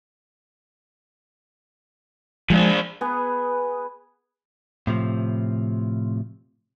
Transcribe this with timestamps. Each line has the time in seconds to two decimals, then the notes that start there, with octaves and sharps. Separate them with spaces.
2.50 A#2 F3 G#3 D4
3.01 B3 G#4 B4
4.87 A2 C3 F3